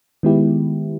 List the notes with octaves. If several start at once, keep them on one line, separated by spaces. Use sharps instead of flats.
D#3 G#3 B3 E4 G4